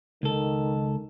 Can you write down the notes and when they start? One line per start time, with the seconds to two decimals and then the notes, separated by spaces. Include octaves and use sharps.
0.23 C#2 D#3 A4